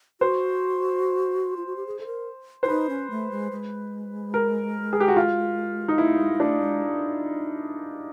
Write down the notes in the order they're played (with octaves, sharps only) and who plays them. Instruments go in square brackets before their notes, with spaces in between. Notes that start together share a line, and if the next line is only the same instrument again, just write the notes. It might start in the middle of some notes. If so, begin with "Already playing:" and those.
[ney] F#4 [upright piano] C5
[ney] F4
F#4
G4
G#4
A4
A#4
[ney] E4 [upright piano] C5
[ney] D#4 [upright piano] B4
[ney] C#4
A3
G#3
G#3
[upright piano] A#4
G#4
G4
F#4
F4
D#4
[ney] A3 [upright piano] E4
[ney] G#3
G#3
[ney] A3 [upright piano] D4
[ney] G#3